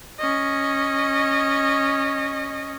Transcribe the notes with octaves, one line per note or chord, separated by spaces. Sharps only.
C#4 D#5